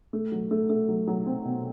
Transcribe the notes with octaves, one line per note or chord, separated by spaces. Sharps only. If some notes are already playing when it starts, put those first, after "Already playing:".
A3
F#3
A3
A3
F#3
F#3
C4
B2